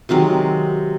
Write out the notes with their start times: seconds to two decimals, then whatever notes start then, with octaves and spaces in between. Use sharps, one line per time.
0.09 C3 D#3 F#3 G#3